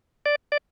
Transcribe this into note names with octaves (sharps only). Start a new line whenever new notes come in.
D5
D5